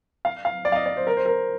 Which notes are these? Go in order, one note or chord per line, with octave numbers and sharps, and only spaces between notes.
F5
F5
D5
F5
D#5
D5
C5
A#4
C5
A#4